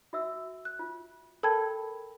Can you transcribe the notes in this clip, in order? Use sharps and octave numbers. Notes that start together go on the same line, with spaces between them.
F#4 E5 E6
F#6
F4
A4 A#4 G5 A5 B5 G#6